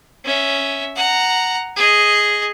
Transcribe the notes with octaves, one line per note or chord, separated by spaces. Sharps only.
C#4 E5
F#5 A#5
G#4 D#5